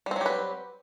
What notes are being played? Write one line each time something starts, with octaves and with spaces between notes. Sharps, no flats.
F#3 G3 C4 G4 B4